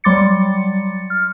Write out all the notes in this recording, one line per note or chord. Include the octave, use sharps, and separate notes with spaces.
F#3 G3 C6 D6 A6 C#7
F6